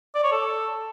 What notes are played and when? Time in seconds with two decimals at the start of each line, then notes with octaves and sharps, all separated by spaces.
0.15 D5
0.23 C#5
0.32 A4